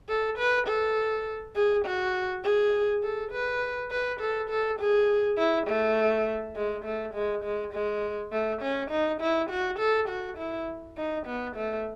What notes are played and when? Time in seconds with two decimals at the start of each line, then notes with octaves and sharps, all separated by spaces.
0.09 A4
0.38 B4
0.67 A4
1.56 G#4
1.85 F#4
2.44 G#4
3.03 A4
3.32 B4
3.91 B4
4.20 A4
4.50 A4
4.79 G#4
5.38 E4
5.67 A3
6.56 G#3
6.85 A3
7.14 G#3
7.44 G#3
7.73 G#3
8.32 A3
8.62 C#4
8.91 D#4
9.21 E4
9.50 F#4
9.79 A4
10.09 F#4
10.38 E4
10.97 D#4
11.26 B3
11.56 A3